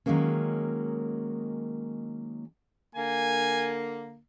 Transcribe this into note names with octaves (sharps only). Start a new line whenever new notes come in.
D#3 F#3 G#3 A#3 C#4
D3 A#3 G#5